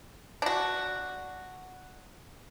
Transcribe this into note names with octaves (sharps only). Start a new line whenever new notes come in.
D4 F#4